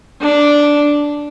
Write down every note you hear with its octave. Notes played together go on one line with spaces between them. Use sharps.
D4